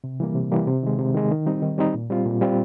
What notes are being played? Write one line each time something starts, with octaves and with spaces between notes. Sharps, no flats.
C3
E3 G3 A#3
C3
E3 G3 A#3
C3
D#3 G#3
C3
D#3 G#3
D#3
G3 C4 D#4
D#3
G3 C4 D#4
A#2
G3 C4 F4
A#2
G3 C4 F4